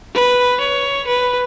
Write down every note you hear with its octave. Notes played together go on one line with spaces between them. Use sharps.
B4
C#5
B4